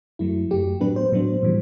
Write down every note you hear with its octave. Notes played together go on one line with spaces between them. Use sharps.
F#2 F#3 A3 E4
F#2 F#3 A3 G4
A2 F#3 B3 D4 B4
C5
A2 F#3 B3 D4
A2 E3 G3